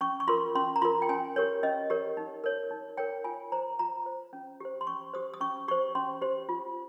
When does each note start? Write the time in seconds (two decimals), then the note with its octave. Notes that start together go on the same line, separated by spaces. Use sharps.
0.01 C#4 C#6
0.20 C#6
0.28 F4 A#4 C6
0.55 C#4 C6
0.76 A#5
0.82 F4 A#4 C6
1.02 G5
1.09 C#4 G#5
1.36 G4 A#4 C#5
1.63 C#4 D#5
1.90 G4 A#4 C#5
2.17 D#4
2.44 A#4 C#5
2.71 D#4
2.97 A#4 C#5 G5
3.24 F4 G#5
3.52 C5 A#5
3.79 F4 A#5
4.06 C5
4.33 C#4
4.60 G4 C5
4.81 C6
4.87 C#4 C#6
5.13 G4 C5 D#6
5.34 D#6
5.40 C#4 C#6
5.68 G4 C5 C#6
5.95 C#4 C6
6.22 G4 C5
6.49 F4